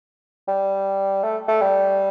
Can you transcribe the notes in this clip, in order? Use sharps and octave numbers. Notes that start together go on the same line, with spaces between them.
G3
A3
A3
G3